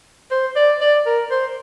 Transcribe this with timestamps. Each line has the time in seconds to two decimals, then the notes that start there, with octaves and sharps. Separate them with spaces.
0.31 C5
0.56 D5
0.81 D5
1.06 A#4
1.31 C5